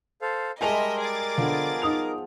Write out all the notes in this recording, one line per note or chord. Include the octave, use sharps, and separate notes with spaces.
A4 C5 F5
G3 G#3 A#4 D#5 E5 G#5 A5 F7
G#4 D6 A6
D3 F3 B3
D#4 D#6 F7